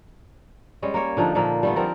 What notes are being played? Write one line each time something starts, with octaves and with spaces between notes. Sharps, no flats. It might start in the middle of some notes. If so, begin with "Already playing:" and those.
G3 G#3 C#4
A#3 C#5
D3 F3 D4 D#4
A#2 F3 A#3
G3 A3 B3
F3 C4 A#4